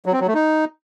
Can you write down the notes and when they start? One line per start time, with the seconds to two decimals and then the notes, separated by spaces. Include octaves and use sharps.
0.06 F#3
0.13 C4
0.20 F#3
0.27 A3
0.34 D#4